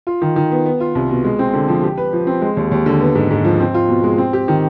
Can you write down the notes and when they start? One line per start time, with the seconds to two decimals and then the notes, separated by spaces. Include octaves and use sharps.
0.07 F4
0.22 D#3
0.36 D#3
0.51 B3
0.66 B3
0.80 F4
0.95 C2
1.10 B2
1.25 G#3
1.39 C4
1.53 D3
1.68 F3
1.83 G4
1.98 B4
2.13 F3
2.27 C4
2.42 G#3
2.57 D#2
2.71 D#2
2.86 D3
3.01 B3
3.15 G#2
3.31 G#2
3.45 F3
3.60 C4
3.74 F4
3.88 B2
4.04 G#3
4.18 C4
4.33 G4
4.48 D#3